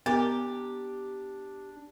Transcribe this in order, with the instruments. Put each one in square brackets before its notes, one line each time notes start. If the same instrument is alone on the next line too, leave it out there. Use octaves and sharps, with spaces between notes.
[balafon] B3 [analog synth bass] D4 [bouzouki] G4 [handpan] A#4